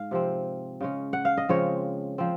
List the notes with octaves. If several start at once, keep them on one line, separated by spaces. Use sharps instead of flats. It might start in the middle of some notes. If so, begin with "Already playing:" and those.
Already playing: G#2 G#3 F5
C3 F3 C4
C#3 G#3 C#4
F#5
F5
D#5
C#3 F3 G#3 C4 C#5
F3 C4